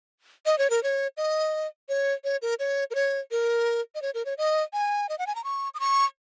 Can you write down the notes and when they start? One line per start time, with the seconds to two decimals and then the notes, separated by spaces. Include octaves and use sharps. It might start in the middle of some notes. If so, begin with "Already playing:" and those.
0.46 D#5
0.58 C#5
0.70 A#4
0.83 C#5
1.17 D#5
1.89 C#5
2.24 C#5
2.42 A#4
2.59 C#5
2.91 A#4
2.95 C#5
3.31 A#4
3.95 D#5
4.02 C#5
4.14 A#4
4.26 C#5
4.38 D#5
4.73 G#5
5.09 D#5
5.19 F#5
5.27 G#5
5.35 A#5
5.44 C#6
5.74 D#6
5.80 C#6